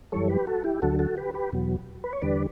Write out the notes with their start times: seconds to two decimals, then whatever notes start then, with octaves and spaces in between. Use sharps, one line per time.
0.12 F#2 E3 G3 A4 C#5
0.29 G4 B4
0.47 F#4 A4
0.64 E4 G4
0.82 D2 D3 F#3 F#4 A4
0.99 F#4 A4
1.17 G4 B4
1.34 G4 B4
1.52 E2 B2 F#3
2.04 B4
2.13 C#5
2.22 E2 D3 G3 B4 D5